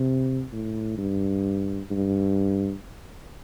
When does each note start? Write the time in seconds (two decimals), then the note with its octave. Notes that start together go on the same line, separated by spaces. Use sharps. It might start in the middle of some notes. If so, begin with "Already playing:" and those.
Already playing: C3
0.53 A2
0.98 G2
1.91 G2